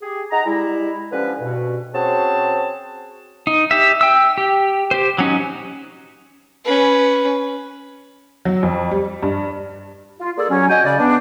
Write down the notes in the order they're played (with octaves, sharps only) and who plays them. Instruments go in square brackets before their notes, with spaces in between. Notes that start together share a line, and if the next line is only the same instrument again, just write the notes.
[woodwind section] G4 G#4
D#4 G#4 F#5 A#5
G3 G#3 E4
D3 F3 G3 C#4 B4
G2 B2
C4 C#4 F#4 G#4 C5 A5
[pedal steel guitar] D#4
G4 E5
G5 E6
G4
G4 C5
F#3 C#4 D#4
[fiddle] C#4 B4
[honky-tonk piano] F#3
F2
G3
G2
[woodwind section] F4
A#3 G#4 A4 D5
F#3 C#4
F#4 D#5 G5 G#5
C#3 D5
B3 D4